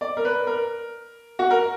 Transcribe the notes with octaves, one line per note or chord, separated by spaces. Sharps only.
D5
A#4
B4
A#4
F#4
A#4